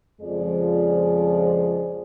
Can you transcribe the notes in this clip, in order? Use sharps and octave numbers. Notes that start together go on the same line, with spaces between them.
F2 C#3 F3 G#3 G#4 D5